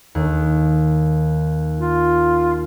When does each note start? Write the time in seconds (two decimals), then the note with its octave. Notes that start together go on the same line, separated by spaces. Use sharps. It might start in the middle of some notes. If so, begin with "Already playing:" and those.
0.15 D#2
1.80 F4